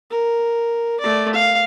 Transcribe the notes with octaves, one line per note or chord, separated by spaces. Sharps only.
A#4
A3 D5
F5